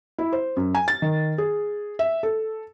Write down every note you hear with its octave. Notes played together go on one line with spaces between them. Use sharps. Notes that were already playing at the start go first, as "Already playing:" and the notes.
E4
C5
F#2
G#5
A6
D#3
G#4
E5
A4